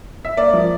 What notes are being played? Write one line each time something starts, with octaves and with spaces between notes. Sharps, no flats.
E5
A#3 D5
F3